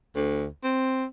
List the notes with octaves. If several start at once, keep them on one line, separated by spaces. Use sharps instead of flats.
D2
C4